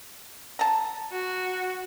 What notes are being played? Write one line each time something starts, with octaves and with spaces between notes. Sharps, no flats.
A5 A#5
F#4